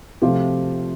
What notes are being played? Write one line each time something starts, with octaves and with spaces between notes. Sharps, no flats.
C3 F3 A3 F4 G4